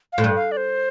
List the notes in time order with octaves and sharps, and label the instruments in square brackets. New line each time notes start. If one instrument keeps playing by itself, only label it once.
[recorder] F5
[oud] A2
G2
[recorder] F5
D5
C5